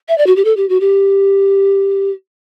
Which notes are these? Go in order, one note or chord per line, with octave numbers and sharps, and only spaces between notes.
E5
D5
F#4
G4
A4
G4
F#4
G4